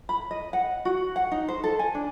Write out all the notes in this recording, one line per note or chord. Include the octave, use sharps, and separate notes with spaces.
B5
D#5
F#5
F#4
F#5
D#4
C5
A4
G#5
D4